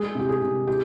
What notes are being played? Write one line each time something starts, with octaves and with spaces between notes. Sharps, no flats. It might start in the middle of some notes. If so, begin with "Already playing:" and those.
Already playing: G#3 G#4
C3 G4
G#4
C3
G4